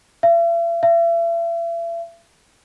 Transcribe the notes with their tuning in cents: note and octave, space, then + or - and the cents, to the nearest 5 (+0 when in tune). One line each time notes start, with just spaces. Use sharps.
E5 +45
E5 +40